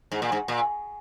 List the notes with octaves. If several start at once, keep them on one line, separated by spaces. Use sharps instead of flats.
G#2
A#2
G#2
A#2